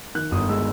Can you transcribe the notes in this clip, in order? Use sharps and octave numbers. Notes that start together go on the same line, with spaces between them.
D#3 F#6
G1 D#6
G#3 E6